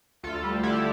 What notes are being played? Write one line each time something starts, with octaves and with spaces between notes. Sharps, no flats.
D2 F4 A4
G3
D3 E4 G4